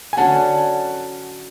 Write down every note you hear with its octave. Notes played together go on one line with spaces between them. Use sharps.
G#5
D3 F#3 C#4 F#5 A5